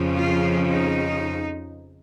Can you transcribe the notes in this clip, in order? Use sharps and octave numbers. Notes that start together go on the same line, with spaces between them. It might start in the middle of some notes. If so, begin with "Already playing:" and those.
Already playing: F2 C#3 F3
F4
D#4